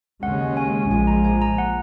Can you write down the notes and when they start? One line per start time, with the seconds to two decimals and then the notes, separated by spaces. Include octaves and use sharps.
0.23 D#2 C#3 G#3 C#4 F#5
0.57 G#5
0.90 A#1 A#2 F3 G#3 G#5
1.07 A#5
1.25 G#5
1.42 A#5
1.58 F#5